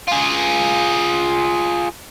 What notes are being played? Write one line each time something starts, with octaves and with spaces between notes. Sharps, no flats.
F4 G#4